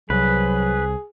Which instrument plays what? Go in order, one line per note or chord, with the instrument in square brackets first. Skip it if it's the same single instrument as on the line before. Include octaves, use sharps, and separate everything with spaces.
[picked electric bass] C2 [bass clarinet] F#3 [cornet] G#4 [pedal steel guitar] B4